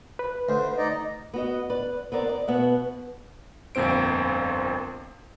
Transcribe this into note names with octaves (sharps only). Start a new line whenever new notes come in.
B4
D2 C5
D#4 D5 D#5
B3 F#4 D#5
B4 D5
B3 C4 A#4 D5
D5 D#5
B2 B3 E5 F#5
G1 F2 A#2 C4 C5 D7